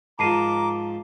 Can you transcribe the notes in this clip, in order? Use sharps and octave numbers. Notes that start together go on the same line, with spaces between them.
G#2 F3 A#4 A5 A#5 D6 C7 D#7